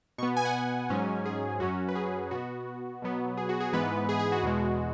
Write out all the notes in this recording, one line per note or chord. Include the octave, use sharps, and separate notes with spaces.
B2 B3 C#6
G#5
F#5
G#5
G#2 F#3 C#4
G#4
F#2 F#3 C#4 F#4
B4
G#4
B2 B3 F#4
B2 F#3 B3
G#4
F#4
G#4
G#2 E3 G#3 B3 B4
G#4
G#4
F#4
E2 B2 G#3